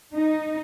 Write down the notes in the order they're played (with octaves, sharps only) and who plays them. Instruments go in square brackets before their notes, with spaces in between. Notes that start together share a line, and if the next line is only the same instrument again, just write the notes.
[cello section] D#4